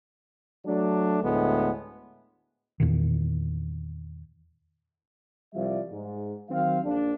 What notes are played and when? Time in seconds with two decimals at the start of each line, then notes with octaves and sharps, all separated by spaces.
0.66 F#3 A3 D4
1.23 D2 A2 G#3 B3
2.80 E2 A#2 D#3
5.54 C2 F3 G3 D5 E5 F5
5.91 G#2
6.50 D#3 F#3 C4 F5
6.84 A#1 D4